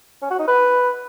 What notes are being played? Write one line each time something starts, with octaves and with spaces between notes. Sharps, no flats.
C#4
F#4
D#4
B4